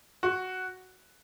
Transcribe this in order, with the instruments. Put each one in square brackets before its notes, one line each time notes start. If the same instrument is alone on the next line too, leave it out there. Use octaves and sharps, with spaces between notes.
[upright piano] F#4